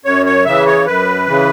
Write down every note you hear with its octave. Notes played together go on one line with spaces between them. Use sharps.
F#2 C#5
C#5
C#3 E3 E5
C#5
F#2 B4
C#3 E3